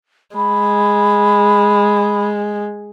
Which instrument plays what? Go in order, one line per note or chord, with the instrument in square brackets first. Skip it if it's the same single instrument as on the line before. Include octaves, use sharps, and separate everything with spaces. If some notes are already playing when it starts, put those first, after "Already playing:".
[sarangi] G#3 [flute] B5